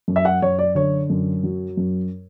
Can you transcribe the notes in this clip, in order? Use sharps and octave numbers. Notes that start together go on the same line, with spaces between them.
F#2
E5
F#5
F#2 C#5
D5
D3 C#5
F#2
F#3
F#2